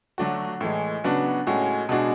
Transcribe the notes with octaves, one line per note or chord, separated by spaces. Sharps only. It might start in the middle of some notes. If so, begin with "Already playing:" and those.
D3 F#3 A3 D4 F#4
A2 E3 G#3
C#3 F#3 B3 D4 F#4
A2 G#3 C#4 F#4
B2 G#3 D4 F#4